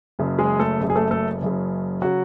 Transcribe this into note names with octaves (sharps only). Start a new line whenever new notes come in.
F#1 F#2 C#3
G#3 G#4
A3 A4
F#1 F#2 C#3
G#4
A3 A4
A3 A4
F#1 F#2 C#3
C#3 F#3 F#4